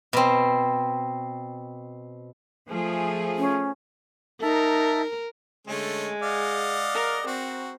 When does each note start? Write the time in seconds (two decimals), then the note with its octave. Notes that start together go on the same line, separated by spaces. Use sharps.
0.13 B2 C4
2.69 F3 A3 G#4
3.38 C#4
4.42 D#4 A#4 E5 A5
5.67 D3 G#3 A3 C#4
6.22 D5 D#5 F5 F#5
6.94 A#4
7.27 C4 F#4